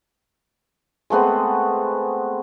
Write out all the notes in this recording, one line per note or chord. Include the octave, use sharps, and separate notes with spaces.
G#3 A3 B3 C4